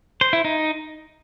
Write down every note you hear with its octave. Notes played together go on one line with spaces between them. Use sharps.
C5
E4
D#4